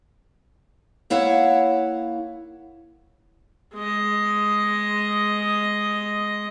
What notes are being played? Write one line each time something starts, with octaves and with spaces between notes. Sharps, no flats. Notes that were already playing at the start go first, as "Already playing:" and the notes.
A#3 E4 C#5 F5 F#5
G#3 D#5